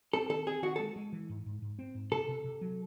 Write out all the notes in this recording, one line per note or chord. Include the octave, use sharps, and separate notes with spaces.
C4 A4
D#3 A4
C4 G#4
D#3 F#4
A4
G#3
G#3
E3
G#2
G#2
G#2
C4
G#2
C3 A4
C3
C3
F#3